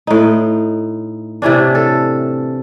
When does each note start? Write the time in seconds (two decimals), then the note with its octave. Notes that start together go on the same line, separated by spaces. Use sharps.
0.07 A2 D#4
1.42 C3 E3 C#4 D4
1.75 A4